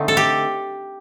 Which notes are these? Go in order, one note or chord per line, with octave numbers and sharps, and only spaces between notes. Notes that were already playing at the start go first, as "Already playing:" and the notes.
Already playing: D3 A3 C4 D#4
A4
G4